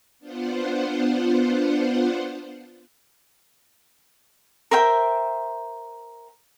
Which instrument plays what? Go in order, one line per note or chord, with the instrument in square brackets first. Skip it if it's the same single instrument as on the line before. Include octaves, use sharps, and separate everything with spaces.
[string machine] B3 D4 F4 C5 F#5
[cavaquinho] A#4 C5 E5 G5